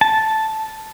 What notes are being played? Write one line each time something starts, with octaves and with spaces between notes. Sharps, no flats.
A5